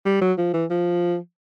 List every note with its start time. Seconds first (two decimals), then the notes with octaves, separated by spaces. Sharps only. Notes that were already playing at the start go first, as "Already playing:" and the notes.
0.06 G3
0.21 F#3
0.38 F3
0.54 E3
0.70 F3